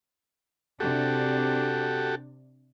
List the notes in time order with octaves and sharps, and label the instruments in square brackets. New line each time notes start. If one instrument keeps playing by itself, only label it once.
[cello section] C3 D4 [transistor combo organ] F#4 G4 A4